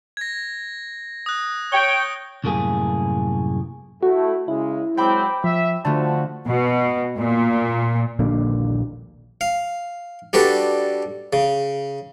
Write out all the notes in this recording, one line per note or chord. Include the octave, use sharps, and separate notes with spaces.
G#6 A#6
D#6 F#6
C#5 G5 G7
C2 F#2 A2 A3 A#3 G#4
A3 E4 F#4
C#3 G#3 E4
F#3 G#3 C4 G5 B5 D6
F3 E5
D3 F3 A3 F#4 A5
B2
A#2
D#1 A#1 D3 A#3
F5
G3 D4 F#4 A4 B4
C#3